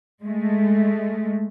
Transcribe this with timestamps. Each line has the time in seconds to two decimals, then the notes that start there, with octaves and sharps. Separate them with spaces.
0.22 G#3 A3